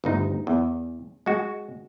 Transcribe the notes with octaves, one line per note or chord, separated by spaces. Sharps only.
G1 D2 D#4
E2
G#3 F#4